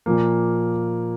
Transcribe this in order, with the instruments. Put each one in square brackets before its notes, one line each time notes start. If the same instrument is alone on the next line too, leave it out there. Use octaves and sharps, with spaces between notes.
[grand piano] A#2 F3 A#3